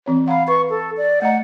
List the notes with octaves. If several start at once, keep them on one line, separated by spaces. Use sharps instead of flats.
E3 C4 C#5
F5 F#5 A#5 B5
B4 C#6
A4
D5
A3 D#5 F#5 A#5